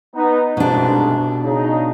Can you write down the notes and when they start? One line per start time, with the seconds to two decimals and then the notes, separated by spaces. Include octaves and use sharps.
0.15 B3 D#4
0.57 C2 G#2 B2 D4
1.44 C#3 D#4